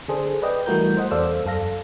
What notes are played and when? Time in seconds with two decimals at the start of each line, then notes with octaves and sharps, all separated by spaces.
0.08 D3 D4 G#4 A4 C5
0.42 B4 D5 D#5 G5
0.66 E3 G3 A3 F#4 A#4 G6
0.97 C5 D#5 F#5
1.11 E2 A4 C5 D5 F5 E6
1.46 F#2 A4 F5 A#6